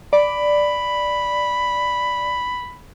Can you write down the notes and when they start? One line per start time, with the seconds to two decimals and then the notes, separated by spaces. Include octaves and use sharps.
0.13 D5 B5